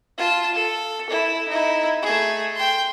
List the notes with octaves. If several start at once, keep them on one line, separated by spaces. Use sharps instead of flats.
F4 A5
A4
E4
D#4 E4
A3 G#4
G5 C6